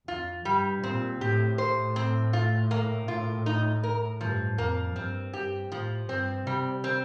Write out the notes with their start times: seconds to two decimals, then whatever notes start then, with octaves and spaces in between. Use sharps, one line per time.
0.08 F2 F4
0.45 G2 G3
0.83 A#2 C4
1.20 A2 G4
1.58 C5
1.96 C4
2.33 F4
2.71 A#3
3.08 F4
3.46 D#4
3.84 A#4
4.21 G2 F3
4.58 F2 A#3
4.96 G2 C4
5.34 G2 G4
5.71 A2 F3
6.09 G2 C4
6.46 C3 G3
6.84 C4